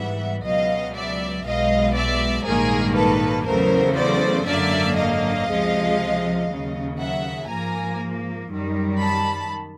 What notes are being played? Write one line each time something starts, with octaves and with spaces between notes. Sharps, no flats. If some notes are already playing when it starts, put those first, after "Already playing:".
Already playing: G#2 E3 G3 B3 E5 F#5
C#2 B2 F#3 D#5 F5
D5 E5
B1 B2 G#3 D#5 F5
D5 E5
A#1 G#2 D#3 G3 A#3 G#4 A#4
A4 B4
E2 C#3 F#3 A3 A#4 C5
C5 D5
G#1 F#2 D3 F#3 A#3 D5 E5
D#5 F5
C#2 C3 F3 G#3
D#2 C#3 F#3
E5 F#5
G#2 F3 A#3 G#5 A#5
F#2 D#3 G3
A5 B5